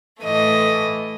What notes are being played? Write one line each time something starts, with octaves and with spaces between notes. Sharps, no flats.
A2 E3 A3 D#5